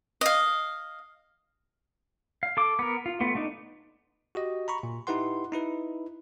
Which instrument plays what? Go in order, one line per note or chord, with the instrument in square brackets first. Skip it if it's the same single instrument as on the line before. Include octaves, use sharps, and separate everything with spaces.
[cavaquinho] D#5 F5
[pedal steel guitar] F5
A4 D6
B3 A#4
F4
A3 B3 F4
A3 D4 D#4
[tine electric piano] F#4 G4 D#5
A#5 B5 C#6
A#2
D#4 E4 G4 B4 F#5 C6
D#4 E4 B4